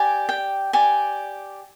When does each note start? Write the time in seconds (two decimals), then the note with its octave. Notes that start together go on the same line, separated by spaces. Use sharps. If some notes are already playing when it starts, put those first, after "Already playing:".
Already playing: G4 D5 G#5
0.29 G5
0.73 G4 D5 G#5